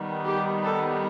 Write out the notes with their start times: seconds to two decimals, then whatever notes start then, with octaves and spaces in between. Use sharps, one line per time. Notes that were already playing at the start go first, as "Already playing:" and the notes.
Already playing: D#3 G3 B3
0.25 G4
0.63 A4